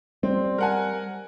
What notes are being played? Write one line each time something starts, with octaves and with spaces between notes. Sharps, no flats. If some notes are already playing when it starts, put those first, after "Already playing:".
G3 C4
A#4 F#5 G#5